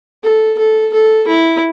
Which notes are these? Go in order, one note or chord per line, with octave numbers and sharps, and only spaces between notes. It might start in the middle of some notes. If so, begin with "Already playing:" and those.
A4
A4
A4
E4